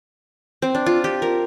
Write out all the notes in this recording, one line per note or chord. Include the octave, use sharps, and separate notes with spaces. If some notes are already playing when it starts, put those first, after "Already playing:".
C4
D4
F4
G4
A#4